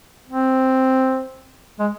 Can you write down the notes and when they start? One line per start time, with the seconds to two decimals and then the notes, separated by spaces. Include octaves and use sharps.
0.28 C4
1.80 G#3